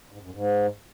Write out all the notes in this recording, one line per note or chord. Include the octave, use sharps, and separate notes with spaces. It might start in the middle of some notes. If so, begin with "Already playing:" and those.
G#2
F#2
G#2